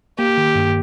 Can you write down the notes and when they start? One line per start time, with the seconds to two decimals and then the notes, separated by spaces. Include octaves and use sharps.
0.18 A#3 G4
0.37 D#3
0.55 G2